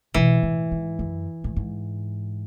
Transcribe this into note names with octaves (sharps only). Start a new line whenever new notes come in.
B2 E3
A2
G#2
F#2
A2
G#2